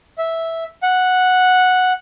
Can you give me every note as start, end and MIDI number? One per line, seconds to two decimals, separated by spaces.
0.18 0.64 76
0.83 1.93 78